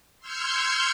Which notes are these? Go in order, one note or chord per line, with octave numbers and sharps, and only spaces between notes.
C6 E6 F6 G6 G#6 C#7